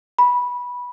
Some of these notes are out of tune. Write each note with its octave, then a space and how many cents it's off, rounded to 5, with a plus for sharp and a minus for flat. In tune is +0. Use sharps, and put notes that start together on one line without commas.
B5 -15